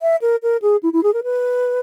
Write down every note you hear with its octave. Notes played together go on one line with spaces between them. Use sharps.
E5
A#4
A#4
G#4
E4
E4
G#4
A#4
B4